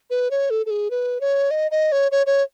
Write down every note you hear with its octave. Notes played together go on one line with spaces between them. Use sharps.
B4
C#5
A4
A4
G#4
B4
C#5
D#5
D#5
C#5
C#5
C#5